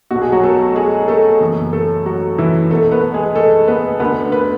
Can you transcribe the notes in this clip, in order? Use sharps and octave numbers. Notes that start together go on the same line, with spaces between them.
B1 B2 F#4
G#4
F#3 F#4
A3 A4
G#3 G#4
A3 A4
F#1 F#2 E3
A3 A4
F#3 F#4
E3 E4
B1 B2 A3 A4
B3 B4
G#3 G#4
A3 A4
B3 B4
D2 D3 B3 B4
B4